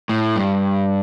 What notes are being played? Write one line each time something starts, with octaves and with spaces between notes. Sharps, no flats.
A2
G2